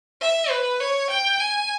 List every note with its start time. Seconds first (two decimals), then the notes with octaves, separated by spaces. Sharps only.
0.21 E5
0.50 B4
0.80 C#5
1.10 G5
1.40 G#5